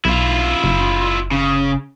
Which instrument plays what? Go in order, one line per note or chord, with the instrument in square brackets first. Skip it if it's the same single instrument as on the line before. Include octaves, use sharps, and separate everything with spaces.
[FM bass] B1 [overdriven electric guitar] E4 F4
[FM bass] F#1
[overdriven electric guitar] C#3